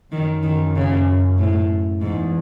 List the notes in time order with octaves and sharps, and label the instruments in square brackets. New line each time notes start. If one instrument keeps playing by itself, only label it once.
[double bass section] F#2 [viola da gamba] D#3
[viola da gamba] D#3
C#3
A2
[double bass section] E2 [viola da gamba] G#2